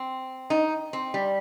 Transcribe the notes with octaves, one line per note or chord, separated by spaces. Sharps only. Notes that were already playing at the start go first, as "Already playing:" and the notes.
Already playing: C4
D#4
C4
G3